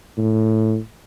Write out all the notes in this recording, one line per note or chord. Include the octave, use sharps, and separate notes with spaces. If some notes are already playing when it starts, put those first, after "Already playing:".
A2